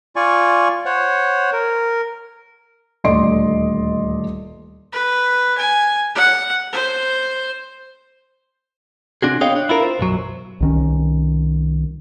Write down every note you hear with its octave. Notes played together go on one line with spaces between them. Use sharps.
F4 D5 G#5 C#6
C5 C#5 F#5
A#4
D#1 D2 D5 D#5 C6 D7
B4
G#5
F#5
C5
C3 C4 D4 F#4 G#4
B3 G#4 C#5 D#5 F5 G5
D4
E4 F4 A#4
C5
B1 F#2 F#3
C2 D#3 C#4